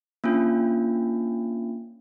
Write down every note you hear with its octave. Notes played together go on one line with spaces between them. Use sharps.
A#3 C#4 D4 F4